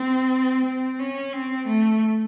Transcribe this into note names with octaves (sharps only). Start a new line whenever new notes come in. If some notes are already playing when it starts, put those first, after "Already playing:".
Already playing: C4
C4
C#4
C4
A3